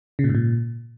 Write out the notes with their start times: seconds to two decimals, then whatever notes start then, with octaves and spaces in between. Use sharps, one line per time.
0.19 C#3
0.24 A#2
0.29 G#2
0.35 A#2